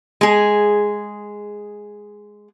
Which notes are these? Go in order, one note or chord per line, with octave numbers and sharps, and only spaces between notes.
G#3 G#4